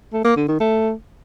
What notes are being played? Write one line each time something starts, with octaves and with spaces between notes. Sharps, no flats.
A3
A#3
D3
D#3
A3